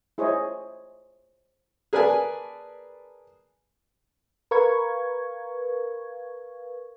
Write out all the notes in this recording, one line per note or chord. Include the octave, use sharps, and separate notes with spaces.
E4 G#4 C5 C#5 D#5
G#4 A#4 B4 D5 G#5 A5
A#4 B4 F5 C#6 G#6